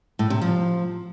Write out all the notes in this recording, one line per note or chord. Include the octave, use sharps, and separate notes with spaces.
A2
C3
F3